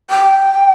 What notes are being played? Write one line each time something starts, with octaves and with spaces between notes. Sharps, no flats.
G5